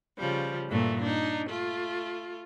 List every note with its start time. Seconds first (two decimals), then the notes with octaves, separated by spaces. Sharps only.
0.17 C#3 F3 G3
0.69 G2 A#2 E3 A3
1.00 D4 D#4
1.47 A3 F4